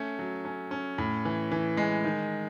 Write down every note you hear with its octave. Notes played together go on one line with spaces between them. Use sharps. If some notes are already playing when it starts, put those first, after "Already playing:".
Already playing: A3 C#4
F#3
C#4
C#4
A2
E3
E3
G#3
D#3